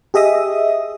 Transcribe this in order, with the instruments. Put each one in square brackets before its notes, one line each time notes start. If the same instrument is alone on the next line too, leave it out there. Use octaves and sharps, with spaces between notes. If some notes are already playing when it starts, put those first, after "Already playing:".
[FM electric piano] G4 G#4 D#5 E5 D#6